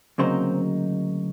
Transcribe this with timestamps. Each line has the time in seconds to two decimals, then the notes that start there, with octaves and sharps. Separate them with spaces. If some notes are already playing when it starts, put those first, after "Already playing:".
0.18 D2 C#3 F#3 A#3 C4 D#4 C5